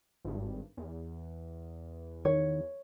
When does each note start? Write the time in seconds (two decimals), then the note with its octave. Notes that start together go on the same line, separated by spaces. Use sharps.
0.25 G#1 G2
0.77 E2
2.25 D#3 C#5